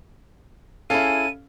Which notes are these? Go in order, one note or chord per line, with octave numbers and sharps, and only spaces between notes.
C#4 E4 G#4 A4 F5 D#7